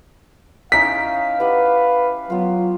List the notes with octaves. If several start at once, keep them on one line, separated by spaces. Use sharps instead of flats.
C#4 D#4 E4 F5 B6
E4 G4 B4 F#5
F#3 B3 F4